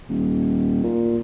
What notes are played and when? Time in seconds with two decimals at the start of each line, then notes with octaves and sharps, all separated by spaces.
0.09 D#1
0.83 A#2